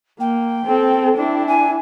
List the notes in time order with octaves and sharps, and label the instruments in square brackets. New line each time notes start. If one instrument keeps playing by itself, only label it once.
[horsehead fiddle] A#3 [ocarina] G5
[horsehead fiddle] C4 A4
D4 E4
[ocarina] G#5